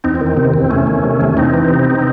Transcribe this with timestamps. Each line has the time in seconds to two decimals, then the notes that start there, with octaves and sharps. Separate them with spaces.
0.04 E2 C4 D#4
0.15 C4
0.21 D#3
0.27 C4
0.37 C3 C4
0.54 E2
0.60 C4
0.71 E2 A3 C#4
0.87 D#3
1.04 C3
1.21 E2
1.29 C#4
1.37 E2 C4 D#4
1.54 E3
1.70 C3